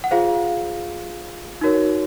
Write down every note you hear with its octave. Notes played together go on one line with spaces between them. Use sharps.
F#5
F4 G#4 C5 F5
D#4 F#4 A#4 C#5